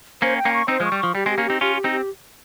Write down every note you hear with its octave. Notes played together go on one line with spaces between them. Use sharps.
A#3 C#4 C5
G5
A#3 C#4
C#6
C4 D#4 C5
F3 G#3
C#6
G3
F3 C#6
G3 G4
G#3 C4
G4
A#3 C#4
C4 D#4 G4
C#4 F4 G4
G4
C4 D#4
G4